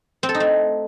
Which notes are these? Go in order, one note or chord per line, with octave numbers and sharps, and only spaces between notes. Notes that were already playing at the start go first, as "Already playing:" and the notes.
C4
A4
D#4
A3